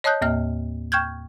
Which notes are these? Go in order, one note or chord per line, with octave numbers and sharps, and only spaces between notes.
C#5 D#5 A5 D#6 F#6 G6
D#2 A2 A#3 D#5 F6
G5 C#6 F6 G6 G#6